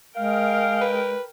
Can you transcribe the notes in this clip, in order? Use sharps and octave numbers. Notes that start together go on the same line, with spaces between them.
G#3 A#4 F5 G5
B4